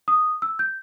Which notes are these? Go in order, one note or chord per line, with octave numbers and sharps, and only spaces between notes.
D#6
E6
G6